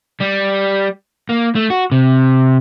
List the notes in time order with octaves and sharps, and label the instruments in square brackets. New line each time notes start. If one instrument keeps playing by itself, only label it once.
[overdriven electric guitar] G3
A#3
A3
F#4
C3